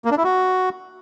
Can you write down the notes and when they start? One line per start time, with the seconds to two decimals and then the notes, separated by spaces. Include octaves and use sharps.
0.05 A#3
0.11 D4
0.18 E4
0.24 F#4